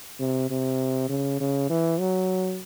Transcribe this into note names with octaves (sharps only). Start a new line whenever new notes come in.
C3
C3
C#3
C#3
E3
F#3